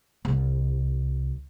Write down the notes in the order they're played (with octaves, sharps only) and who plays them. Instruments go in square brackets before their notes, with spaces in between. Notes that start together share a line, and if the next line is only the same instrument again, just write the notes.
[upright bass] C2